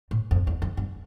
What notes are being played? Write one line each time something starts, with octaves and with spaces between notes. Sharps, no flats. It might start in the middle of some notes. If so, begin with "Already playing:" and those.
A2
F2
E2
F2
G2